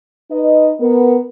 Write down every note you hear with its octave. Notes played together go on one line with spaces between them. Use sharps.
D#4 B4 D#5
B3 A#4